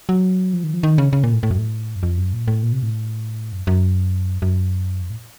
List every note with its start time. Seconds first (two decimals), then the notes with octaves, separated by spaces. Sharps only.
0.09 F#3
0.53 F3
0.64 D#3
0.74 F3
0.83 D#3
0.98 C#3
1.13 C#3
1.23 A#2
1.33 A2
1.43 A2
1.51 F#2
1.58 A2
1.96 F#2
2.03 F2
2.18 F#2
2.33 A#2
2.48 A2
2.63 A#2
2.72 C3
2.83 A2
3.52 F#2
3.67 F#2
4.42 F#2
5.02 F2
5.10 A2